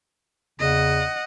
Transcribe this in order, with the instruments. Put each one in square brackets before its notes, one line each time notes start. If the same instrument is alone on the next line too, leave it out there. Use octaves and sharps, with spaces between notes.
[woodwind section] E2 C#3 [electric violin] D#5 F#5